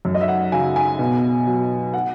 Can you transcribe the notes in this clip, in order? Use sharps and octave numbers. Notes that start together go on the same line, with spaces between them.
F#2
D#5
E5
F#5
C#3 F#3 G#5
G#5
B2
F#3
F#5